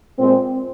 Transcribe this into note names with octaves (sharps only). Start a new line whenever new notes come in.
A#2 G#3 C4